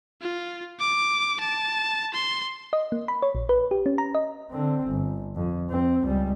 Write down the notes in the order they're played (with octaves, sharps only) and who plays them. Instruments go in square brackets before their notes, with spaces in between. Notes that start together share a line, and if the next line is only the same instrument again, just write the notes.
[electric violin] F4
D6
A5
C6
[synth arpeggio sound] D#5
A#3
B5
C#5
A#1
B4
G4
C#4
A#5
D#5
[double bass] D3 C4
G1
F2
F2 C4
C#2 G3